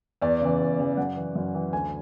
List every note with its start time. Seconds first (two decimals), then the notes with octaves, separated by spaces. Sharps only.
0.22 E2 D5
0.41 C#3 E3
0.60 E2
0.79 C#3 E3
0.97 F#2 F#5
1.16 E3
1.35 F#2
1.55 E3
1.73 D2 G#5